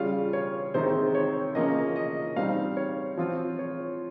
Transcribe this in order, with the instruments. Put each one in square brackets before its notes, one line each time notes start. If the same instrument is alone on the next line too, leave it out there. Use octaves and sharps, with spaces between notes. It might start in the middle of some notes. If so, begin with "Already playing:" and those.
Already playing: [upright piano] C#3 G3 C#4 F4 F5
C#5
C3 D#3 G#3 D#4 C5
C#5
C#3 F3 A#3 C#4 D#5
D#5
G3 C4 D#4 F5
C#5
F3 C4 F4
C#5